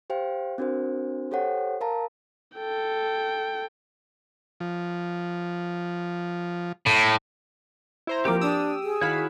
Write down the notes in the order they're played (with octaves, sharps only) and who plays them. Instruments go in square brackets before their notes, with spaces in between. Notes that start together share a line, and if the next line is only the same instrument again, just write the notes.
[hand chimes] G4 C5 F5 G5
C4 D4 F#4 A#4 C5
G4 A4 C5 C#5 F#5 G5
A#4 F5 A5 A#5
[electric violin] A4 G5
[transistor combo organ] F3
[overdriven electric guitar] A2
[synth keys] E4 C5 A#5
[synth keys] F3 A#3 C4 [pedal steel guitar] G4 G5 D6 [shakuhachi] A#4
[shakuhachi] D4 [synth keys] D#6 E6
[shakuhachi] G#4
[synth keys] D#3 F5 B5 [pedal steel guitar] E4 F#4 C#5